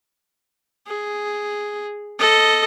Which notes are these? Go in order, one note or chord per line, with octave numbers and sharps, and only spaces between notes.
G#4
A4 D#5